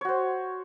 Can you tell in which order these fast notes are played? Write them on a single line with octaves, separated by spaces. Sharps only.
C#5 F#4 C5